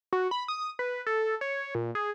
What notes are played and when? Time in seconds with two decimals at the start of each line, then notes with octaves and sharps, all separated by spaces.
0.13 F#4
0.31 B5
0.48 D#6
0.79 B4
1.06 A4
1.41 C#5
1.75 A#2
1.95 G#4